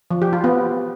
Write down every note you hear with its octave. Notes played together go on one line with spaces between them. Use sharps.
F3
G4
F4
B3